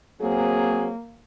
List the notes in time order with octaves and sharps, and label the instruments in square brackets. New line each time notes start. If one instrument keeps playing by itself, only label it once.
[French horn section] F#3 C4 G#4 [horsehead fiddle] A#3